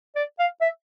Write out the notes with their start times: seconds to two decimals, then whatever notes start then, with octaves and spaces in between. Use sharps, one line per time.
0.16 D5
0.39 F5
0.61 E5